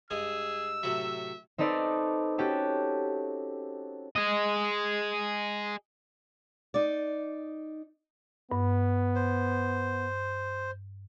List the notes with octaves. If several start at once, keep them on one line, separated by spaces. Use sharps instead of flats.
G2 G#3 G#4 D#6 E6
A2 C3 F#3 E5
C4 D#4 A4 B4 D5
C#4 F#4 G4 A4
G#4 D#5
D#4 D5
G2 B3
C5